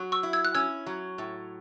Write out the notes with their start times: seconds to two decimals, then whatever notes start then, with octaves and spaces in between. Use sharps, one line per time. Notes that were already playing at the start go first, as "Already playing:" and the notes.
Already playing: F#3
0.12 C#6 E6
0.23 E4
0.33 E6 G#6
0.45 F#6
0.55 C#4 E6 G#6
0.86 F#3
1.18 A2